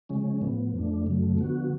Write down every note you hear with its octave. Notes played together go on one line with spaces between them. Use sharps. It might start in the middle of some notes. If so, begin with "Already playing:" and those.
C#3 F3 G#3 C#4
A2 F3 B3
F2 F3 A3 D4
F#2 C#3 F#3 A3
D3 F3 B3 F#4